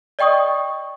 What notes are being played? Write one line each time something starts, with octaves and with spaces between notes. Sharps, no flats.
D5 D#5 G5 C#6 D#6